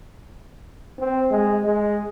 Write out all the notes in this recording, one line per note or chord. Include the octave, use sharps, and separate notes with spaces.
C4
G#3
G#3